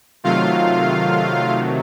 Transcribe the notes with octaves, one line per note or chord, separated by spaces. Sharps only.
C3 D#3 F#3 A3 F4 F5